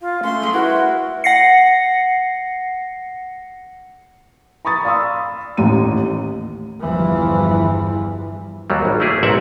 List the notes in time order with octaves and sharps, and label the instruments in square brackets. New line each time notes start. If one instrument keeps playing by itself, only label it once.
[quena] F4 [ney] F5
[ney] A3 [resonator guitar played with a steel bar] C#4 [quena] C6
[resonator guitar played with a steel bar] G3 G#3
[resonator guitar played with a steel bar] E4 A#4 E5 [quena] F#4 [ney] B4
[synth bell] F#5 A#6 C7 C#7
[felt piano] A#5 B5 C#6 D#6 A6
D5 F5 B5 C6 D#6 E6
A1 D#2 A2 A#5 D#7
[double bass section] G1 E2 G2 E3 F3
[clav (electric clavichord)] D#2 F#3 G3
G#1
A3 A#3 E4 G#4
A1 G#2 C4 D5 E5 F#5